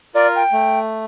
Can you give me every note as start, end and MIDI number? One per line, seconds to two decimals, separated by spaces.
0.15 0.42 65
0.15 0.42 70
0.15 0.28 74
0.36 0.79 79
0.52 1.05 57